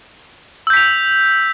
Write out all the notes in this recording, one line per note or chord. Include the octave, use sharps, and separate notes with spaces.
E6 G6 B6 F7